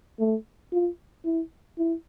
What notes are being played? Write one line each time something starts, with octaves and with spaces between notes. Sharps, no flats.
A3
F4
E4
E4